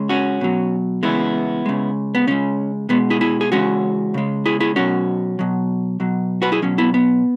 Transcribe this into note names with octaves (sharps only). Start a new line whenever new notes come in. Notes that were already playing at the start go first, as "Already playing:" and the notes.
Already playing: C#3 G#3
C#4 F#4
B2 F#3
C#3 E3 G#3 B3 E4
C#3 G#3
B3
C#3 G#3 C#4
B2 G#3 B3
E4 G#4
E4 G#4
G#4
C#3 E3 G#3 C#4 F#4
C#3 G#3
E4 G#4
E4 G#4
B2 F#3 C#4 F#4
B2 F#3
B2 F#3
F#4 B4
E4 G#4
B2 F#3 C#4
B3 E4
B3